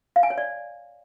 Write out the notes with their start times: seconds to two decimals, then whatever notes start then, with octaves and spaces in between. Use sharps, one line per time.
0.16 F5
0.23 G#5
0.30 C#5
0.38 D5